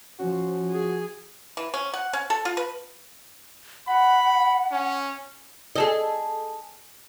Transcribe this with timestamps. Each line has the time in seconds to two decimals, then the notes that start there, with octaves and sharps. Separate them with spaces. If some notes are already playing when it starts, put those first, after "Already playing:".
0.19 F3 C#4 F#4
0.71 G#4
1.57 E3
1.74 C#4
1.94 F#5
2.13 C#4
2.30 A4
2.45 F4
2.57 B4
3.87 F#5 B5
4.71 C#4
5.76 G#4 A4 D#5